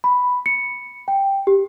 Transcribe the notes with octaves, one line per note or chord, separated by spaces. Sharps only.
B5
C#7
G5
G4